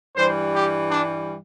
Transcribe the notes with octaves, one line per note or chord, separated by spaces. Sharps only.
G2 E3 G3 C5
G4
D4